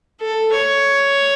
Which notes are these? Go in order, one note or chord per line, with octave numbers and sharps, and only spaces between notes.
A4
C#5